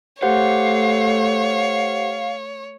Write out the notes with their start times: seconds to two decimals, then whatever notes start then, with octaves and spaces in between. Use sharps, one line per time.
0.22 A3 G4 C5 C#5 F5 F#5